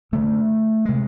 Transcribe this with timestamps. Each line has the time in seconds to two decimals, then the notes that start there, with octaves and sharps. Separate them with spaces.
0.12 F#2 D3 A3
0.85 C3 G#3